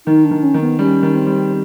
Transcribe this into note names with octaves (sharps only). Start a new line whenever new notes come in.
D#3 D#4
D4
D#3
C#4
D#3
B3
G3 C#4
D#3
C4
G3